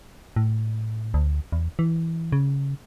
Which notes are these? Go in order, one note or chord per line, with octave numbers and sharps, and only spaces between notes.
A2
D2
E2
E3
C#3